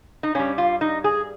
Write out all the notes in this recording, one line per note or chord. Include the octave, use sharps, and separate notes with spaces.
D#4
G2 G3 C#4
F4
D#4
G#4